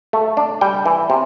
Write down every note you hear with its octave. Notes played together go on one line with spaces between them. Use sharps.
A3
D4
G3 G5
E3
C3